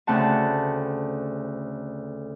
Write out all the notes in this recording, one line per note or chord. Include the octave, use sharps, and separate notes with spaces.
D2 C#3 C4 F#5 A5